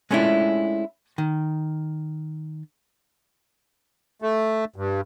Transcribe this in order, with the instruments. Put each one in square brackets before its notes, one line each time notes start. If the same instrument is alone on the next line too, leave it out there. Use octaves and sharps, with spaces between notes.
[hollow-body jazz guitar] G#3 A3 C#4 D4 E4 F4
D#3
[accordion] A3
G2